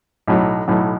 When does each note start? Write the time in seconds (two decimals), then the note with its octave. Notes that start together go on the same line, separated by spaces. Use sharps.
0.28 B1 A2 F#3
0.68 B1 A2 F#3